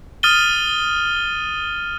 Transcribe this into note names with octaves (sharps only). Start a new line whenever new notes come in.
D#6 F6 A6 D#7 G7